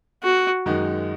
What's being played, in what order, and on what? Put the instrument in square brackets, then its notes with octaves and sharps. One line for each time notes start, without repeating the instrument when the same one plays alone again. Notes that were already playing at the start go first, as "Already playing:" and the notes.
[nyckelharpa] F#4
[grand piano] F#2 D#3 G#3 D#4 F#4